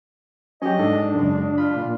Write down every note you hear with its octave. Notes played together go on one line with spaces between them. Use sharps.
F#3 C#4 G4 D#5
G#2 D4 A4
F#2 C#3 G#3
F4 B5
A#2